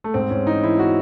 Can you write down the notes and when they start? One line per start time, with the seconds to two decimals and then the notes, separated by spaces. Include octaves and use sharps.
0.04 A3
0.14 G#2 C4
0.30 G#2 C#4
0.47 E3 D#4
0.63 E3 E4
0.79 F#4